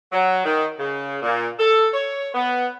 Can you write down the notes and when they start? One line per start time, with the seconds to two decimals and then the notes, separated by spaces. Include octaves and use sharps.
0.12 F#3
0.45 D#3
0.79 C#3
1.22 A#2
1.59 A4
1.94 C#5
2.35 B3